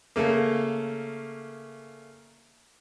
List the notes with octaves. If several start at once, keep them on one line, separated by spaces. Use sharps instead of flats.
C#3 A3 A#3